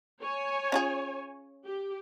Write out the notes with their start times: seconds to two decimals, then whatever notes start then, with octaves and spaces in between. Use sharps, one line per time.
0.21 C#5 G#5
0.72 C#4 F4 G#4
1.65 G4